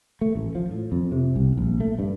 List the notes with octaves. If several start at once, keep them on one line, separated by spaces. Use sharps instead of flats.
A3
A1
F3
A2
F2
C3
C2
A#1
A3
G2